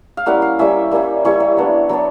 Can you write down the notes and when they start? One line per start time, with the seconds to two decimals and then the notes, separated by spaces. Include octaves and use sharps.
0.17 F5
0.26 G3 A#3 C#4 E4 F#5
0.42 F5
0.59 G3 A#3 C#4 E4 E5
0.91 G3 A#3 C#4 E4
1.25 G3 A#3 C#4 E4 C#5
1.40 C#5
1.57 F#3 B3 D4
1.89 F#3 B3 D4